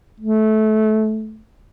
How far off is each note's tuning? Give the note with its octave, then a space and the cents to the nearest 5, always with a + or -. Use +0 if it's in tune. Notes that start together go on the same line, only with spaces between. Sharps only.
A3 -20